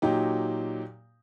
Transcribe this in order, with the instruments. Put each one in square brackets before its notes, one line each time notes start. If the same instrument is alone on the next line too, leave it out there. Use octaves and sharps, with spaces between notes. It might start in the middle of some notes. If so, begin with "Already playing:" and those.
[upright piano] A#2 F#3 D#4 G4